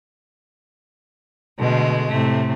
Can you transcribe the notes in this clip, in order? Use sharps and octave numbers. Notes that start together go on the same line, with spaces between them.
B2 D3 G#3 A3
A2 C3 A3